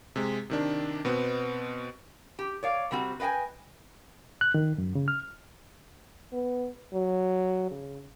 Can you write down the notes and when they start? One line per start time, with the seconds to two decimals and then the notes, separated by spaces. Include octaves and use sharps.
0.16 C3 G#3
0.50 C3 D#3 D4
1.05 B2 B3 C4
2.39 G4
2.63 C#5 D5 F5
2.91 C3 G3 C4 F#4
3.20 B4 D#5 F5 G5 G#5
4.41 F#6
4.54 D#3
4.78 F#2
4.95 C#3
5.08 F6
6.33 B3
6.94 F#3
7.71 C#3